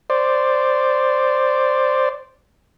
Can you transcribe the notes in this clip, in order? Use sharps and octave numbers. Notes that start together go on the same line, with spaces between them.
C5 D5